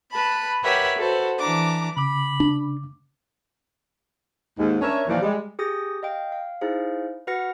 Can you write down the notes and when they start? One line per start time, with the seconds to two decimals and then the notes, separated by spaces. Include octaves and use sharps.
0.12 B4 A5 B5
0.64 G4 A#4 B4 C#5 E5 F#5
0.98 F#4 A4 B4 C5
1.38 E3 D4 A#5 D6
1.97 C#3 B5 D6
2.40 D4
4.58 D#2 G#2 D#3
4.81 C#4 D4 A#4 C#5 E5
5.08 D#2 A#2 E3 F3 D5 F5
5.22 G3 G#3
5.59 G4 G#4 D#6 G6 A#6
6.03 D#5 F5 G5
6.32 F5
6.61 D#4 E4 G#4 C5 F5
7.27 F#4 B4 F#5 F6 A#6 C#7